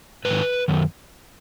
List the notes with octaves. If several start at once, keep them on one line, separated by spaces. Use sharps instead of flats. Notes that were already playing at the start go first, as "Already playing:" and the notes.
G#2 D#3 B4
F#2 D#3